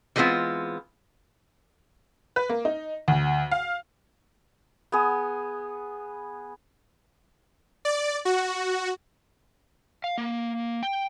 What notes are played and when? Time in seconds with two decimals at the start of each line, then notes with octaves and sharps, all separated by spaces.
0.16 E3 G3 G#3 B3 C4 F4
2.36 B4
2.49 A#3
2.65 D#4
3.08 D2
3.51 F5
4.92 B3 G#4
7.85 D5
8.25 F#4
10.04 F5
10.18 A#3
10.83 G5